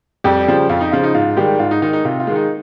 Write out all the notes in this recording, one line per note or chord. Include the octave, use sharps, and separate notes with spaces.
F2 G3 G4
C#3 F3
F2 F4
D#4
C#3 F3 F4
D#4
G#2 F4
D#3 G3 G#3 G4
G#2 F4
D#4
D#3 G#3 D#4
D#4
C3 F4
F4
D#3 G#3
D#4